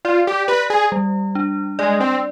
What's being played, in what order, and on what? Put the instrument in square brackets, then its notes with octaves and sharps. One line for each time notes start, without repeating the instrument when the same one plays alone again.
[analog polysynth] F4 [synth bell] D5
[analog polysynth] G4
[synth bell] G4 [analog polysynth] B4
[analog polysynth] G#4
[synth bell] G3
D4
[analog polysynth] G#3 [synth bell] D5
[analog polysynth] C4